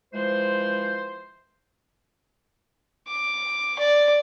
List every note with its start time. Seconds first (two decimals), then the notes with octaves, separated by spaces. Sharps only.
0.13 E3 F3 G#3 C5
3.08 D6
3.79 D5